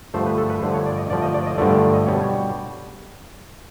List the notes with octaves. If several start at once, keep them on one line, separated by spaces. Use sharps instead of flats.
G2 D3 F3 A3 C5
B4
A4
B4
G2 D3 F3 A3 C5
C#5
D5
D#5
G2 D3 F3 A3 D5
D#5
D5
D#5
G2 D3 F3 A3 D5
D5
D#5
B2 G3 C#5